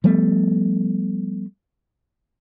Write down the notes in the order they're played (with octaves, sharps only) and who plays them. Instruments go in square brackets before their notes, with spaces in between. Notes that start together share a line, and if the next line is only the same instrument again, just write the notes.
[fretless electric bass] F3 G3 A3 B3